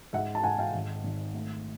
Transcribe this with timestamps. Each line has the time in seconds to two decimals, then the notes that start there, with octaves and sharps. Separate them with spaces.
0.13 G#2 E5 F#5
0.35 A5
0.43 G#2 F#5 G#5
0.59 F5 G5
0.74 G#1
1.04 G#1
1.34 A3